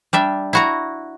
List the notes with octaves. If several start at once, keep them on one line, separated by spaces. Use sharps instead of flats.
G3 D4 E5
E4 F#4 A#5